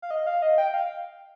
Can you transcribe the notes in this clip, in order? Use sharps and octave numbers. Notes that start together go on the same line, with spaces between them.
F5
D#5
F5
D#5
G5
F5